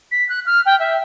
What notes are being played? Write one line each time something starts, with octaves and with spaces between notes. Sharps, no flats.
B6
F#6
F6
G5
E5